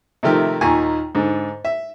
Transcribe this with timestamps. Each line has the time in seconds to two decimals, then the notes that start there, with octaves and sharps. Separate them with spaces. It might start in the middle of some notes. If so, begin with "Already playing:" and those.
0.23 C3 D#3 F3 A3 G4 A#4
0.61 D#2 A#2 D#3 G#5 C#6
1.15 G#2 D3
1.65 E5